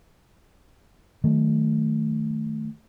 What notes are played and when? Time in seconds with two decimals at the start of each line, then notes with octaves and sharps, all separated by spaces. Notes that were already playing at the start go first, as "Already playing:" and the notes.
1.24 D#3 F#3 A3